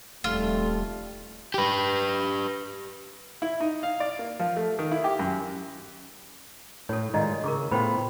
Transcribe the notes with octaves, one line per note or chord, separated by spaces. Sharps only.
D#1 F2 G3 A3 F4
G4 B4
E4
D#4
F5
D5
A#3
F3
A3
D#3
E4
G4
F#2
A2 A4 C#5
G#2 D#3 E4 F4 D5 D#5
C#3 A#4 C#6 D6
A2 B3 F4 C5 G5 B5